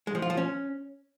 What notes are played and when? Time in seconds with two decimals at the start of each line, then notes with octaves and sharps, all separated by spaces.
0.07 G#3
0.15 F3
0.22 F4
0.30 F3
0.37 C#4